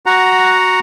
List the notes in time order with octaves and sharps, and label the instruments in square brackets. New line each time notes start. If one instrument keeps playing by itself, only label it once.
[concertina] F#4 F#5 A#5